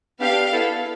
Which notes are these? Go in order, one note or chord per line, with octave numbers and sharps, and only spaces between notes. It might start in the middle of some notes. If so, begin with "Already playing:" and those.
B3 D4 G4 F5
B3 E4 A4